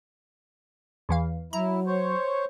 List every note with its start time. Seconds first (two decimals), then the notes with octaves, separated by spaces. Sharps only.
1.09 E2 E3 F5
1.53 F#3 E4 A#5
1.87 C5 C#5